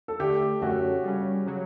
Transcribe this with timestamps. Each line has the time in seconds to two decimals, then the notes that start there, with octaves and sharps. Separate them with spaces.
0.08 A4
0.19 D3 A3 D4 G4
0.61 F#2 D3 A3 C#4 F#4
1.03 C#3 G3 C#4
1.46 C#3 F#3